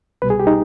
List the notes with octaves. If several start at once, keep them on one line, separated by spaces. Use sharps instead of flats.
C2 B2 G3 B4
G#4
G4
D#4